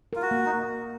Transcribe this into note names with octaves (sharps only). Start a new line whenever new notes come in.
F4 A#4
F#4
A#3
D#4